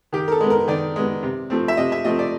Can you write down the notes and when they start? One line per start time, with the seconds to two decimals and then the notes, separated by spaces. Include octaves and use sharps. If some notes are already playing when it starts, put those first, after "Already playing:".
0.13 D#3 G4
0.28 A#4
0.32 A4
0.41 G#3 B3
0.50 A#4
0.68 D#3 D5
0.96 G#3 B3
1.23 C3
1.50 F3 A3 C4
1.68 E5
1.77 C3 D#5
1.92 E5
2.05 F3 A3 C4 D#5
2.19 D5